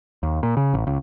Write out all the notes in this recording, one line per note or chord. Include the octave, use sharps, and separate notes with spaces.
D#2
A#2
C#3
A1
C#2